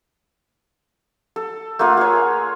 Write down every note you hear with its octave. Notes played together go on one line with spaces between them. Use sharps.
A4
A3 A#3 F4 F#5
G#4 C#5